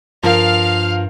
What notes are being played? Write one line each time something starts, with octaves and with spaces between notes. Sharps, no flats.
G2 F3 A#4 F5